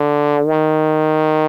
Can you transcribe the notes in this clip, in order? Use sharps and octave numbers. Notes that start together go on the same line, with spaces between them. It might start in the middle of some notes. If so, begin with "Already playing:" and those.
Already playing: D3
D#3